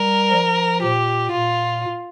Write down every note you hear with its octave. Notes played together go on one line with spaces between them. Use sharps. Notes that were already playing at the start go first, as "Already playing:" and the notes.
Already playing: G3 A#4
F3
A#2 G4
A#2 F4